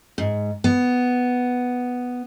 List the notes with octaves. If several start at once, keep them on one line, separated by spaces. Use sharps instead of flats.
G#2
B3